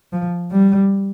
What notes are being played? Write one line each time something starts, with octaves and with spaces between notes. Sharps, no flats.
F3
G3